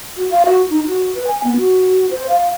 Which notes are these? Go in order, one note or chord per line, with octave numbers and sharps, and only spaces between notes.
F#4
F5
F#4
D#4
F#4
B4
G#5
B3
F#4
C5
F5